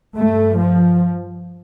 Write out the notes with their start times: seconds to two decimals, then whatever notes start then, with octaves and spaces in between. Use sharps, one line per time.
0.16 G2 A3
0.57 F3